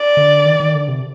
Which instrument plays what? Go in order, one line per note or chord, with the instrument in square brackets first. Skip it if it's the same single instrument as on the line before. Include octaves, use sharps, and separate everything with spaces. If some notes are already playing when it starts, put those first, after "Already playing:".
Already playing: [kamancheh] D5
[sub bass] D3
D#3
D#3
D3
C3